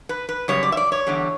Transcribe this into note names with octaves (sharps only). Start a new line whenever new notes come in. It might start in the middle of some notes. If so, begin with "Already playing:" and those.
B4
B4
F#2 C#3 G3 C#5
D5
E5
D5
C#5
E2 D3 G3